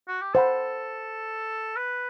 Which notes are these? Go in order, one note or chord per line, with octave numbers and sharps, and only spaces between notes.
F#4
G4
A4 C5 F#5 B5
B4